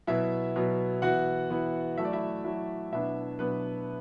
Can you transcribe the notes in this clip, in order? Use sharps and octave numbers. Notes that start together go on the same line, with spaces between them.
B2 F#3 B3 E4 E5
B2 F#3 B3
E3 B3 E4 F#4 F#5
E3 B3 E4
F#3 A3 E4 E5
D5
E4 E5
F#3 A3 E4
B2 F#3 B3 D4 E4 E5
B2 F#3 B3 D4 B4